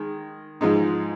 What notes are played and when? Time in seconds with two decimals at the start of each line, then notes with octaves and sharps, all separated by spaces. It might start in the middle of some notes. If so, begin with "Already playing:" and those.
Already playing: D#3 G#3
0.61 G#2 F3 G#3 D#4